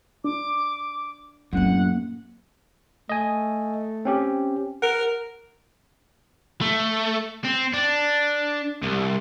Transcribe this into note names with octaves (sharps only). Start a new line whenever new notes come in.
D4 D6
F#2 A2 A#3 C4 F#5
A3 D#5 G#5
C4 C#4 G4
A#4 F#5
A3
C4
D4
C2